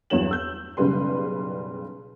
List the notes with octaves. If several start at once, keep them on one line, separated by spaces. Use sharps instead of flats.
E2 G2 F#3 C#5 E7 F#7
E6 G6
F#1 B1 C#3 G3 B4 C6